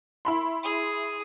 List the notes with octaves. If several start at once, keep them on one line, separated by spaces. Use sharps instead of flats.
E4 B5 C6
G#4 D#6